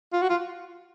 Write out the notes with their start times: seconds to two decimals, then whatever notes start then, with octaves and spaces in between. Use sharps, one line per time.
0.13 F4
0.22 F#4
0.29 F4